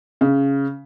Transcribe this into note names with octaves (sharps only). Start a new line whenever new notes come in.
C#3